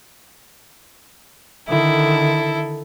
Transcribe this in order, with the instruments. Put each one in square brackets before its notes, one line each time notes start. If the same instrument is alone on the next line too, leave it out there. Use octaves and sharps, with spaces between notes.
[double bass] D3 D#3 [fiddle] E4 A4